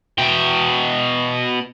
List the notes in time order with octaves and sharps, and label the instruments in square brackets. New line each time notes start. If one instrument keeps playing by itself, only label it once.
[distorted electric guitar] B2 G5